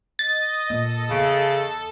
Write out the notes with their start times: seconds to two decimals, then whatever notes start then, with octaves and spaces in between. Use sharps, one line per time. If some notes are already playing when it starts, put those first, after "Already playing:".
0.19 D#5 A6
0.70 A#2 A#3 A4
1.10 E2 C#3